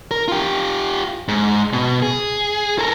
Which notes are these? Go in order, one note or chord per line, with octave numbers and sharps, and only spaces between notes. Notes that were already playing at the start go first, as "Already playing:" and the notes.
A#4
F4 G4
G#2
B2
G#4
A4 A#4